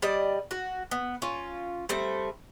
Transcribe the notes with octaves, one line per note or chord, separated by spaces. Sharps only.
G3 D5 D#5
F#4
B3
C#4 F4
G3 A3 C4